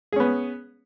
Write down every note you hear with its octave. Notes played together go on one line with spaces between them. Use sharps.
B3 C#4 G#4